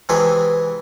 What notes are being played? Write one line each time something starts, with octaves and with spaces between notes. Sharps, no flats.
C3 E3 G#3 G#4 A4 B4